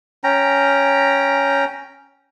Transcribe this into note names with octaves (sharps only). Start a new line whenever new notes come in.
C#4 G5 A#5